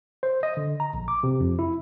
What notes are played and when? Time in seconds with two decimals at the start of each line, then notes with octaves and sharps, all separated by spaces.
0.23 C5
0.43 D#5
0.57 D3
0.80 A#5
0.94 A#1
1.08 D6
1.23 C3
1.40 F2
1.59 E4